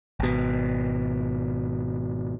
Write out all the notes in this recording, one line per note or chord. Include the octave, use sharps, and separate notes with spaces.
G#1 B2